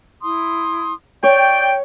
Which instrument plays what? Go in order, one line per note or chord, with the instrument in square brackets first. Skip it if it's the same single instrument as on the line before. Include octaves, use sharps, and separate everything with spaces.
[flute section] E4 C6 D#6
[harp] C#5 [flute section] D5 [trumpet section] G5